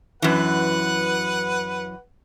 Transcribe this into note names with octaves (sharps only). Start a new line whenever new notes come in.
F#2 E3 B4 F#5